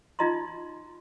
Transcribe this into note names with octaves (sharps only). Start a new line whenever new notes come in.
D#4 F4 F#4 D#5 A#5 C6